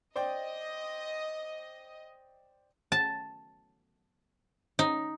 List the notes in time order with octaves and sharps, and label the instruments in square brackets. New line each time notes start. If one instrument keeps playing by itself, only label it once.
[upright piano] C5 D5 G5 [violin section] D#5
[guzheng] A5
D#4